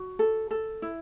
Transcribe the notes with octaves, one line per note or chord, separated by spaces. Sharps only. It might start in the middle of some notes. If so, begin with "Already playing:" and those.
Already playing: F#4
A4
A4
E4